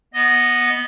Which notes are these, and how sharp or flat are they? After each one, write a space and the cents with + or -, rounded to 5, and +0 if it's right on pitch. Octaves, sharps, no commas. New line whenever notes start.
B3 -10 D#5 +0